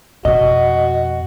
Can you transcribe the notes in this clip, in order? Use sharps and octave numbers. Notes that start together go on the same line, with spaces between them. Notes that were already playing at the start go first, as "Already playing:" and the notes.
F2 B2 F#4 D#5